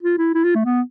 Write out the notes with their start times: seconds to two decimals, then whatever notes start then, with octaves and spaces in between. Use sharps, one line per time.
0.03 F4
0.18 E4
0.34 E4
0.44 F4
0.55 A3
0.65 B3